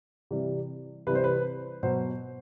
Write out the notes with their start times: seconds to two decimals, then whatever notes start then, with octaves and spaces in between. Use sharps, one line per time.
0.31 C3 E3 G3
1.07 C3 E3 G3 B4
1.15 C5
1.24 B4
1.83 B2 F#3 C5